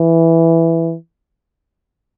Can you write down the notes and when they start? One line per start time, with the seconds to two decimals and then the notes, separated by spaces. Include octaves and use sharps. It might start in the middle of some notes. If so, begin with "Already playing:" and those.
Already playing: E3